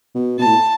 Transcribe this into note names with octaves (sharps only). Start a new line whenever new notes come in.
B2
B2 A5
A2